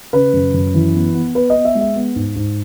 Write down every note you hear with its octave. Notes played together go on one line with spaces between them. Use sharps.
C#3 B4
F#2
F#2
E3
B3
B3
B3 B4
D#5
B3
E5
G#3
E5
B3
G#2
G#2